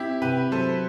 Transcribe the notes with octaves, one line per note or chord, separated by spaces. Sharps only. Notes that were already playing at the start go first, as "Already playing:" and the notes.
Already playing: C4 E4 G4
C3 G4 B4
F#3 A4 C5